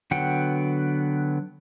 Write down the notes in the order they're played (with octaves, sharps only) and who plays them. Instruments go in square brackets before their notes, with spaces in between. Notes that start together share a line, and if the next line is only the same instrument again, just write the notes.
[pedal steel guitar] D3 F#3 B3 F#5 G5